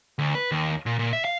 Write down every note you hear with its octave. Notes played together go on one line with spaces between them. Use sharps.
D2
B4
D#2
A#2
A#2
E5
F5